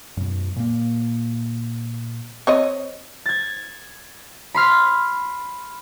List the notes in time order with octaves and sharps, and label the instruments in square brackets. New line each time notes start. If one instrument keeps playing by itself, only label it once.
[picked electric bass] F#2 B2
A#2 A#3
[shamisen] C4 C#5 D#5
[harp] G#6 A6
B5 C6 F6 B6